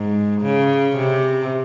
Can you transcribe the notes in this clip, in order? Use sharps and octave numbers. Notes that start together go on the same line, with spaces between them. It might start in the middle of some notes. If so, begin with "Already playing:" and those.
Already playing: G#2
C#3
C3